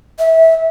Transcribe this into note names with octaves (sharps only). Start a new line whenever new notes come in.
E5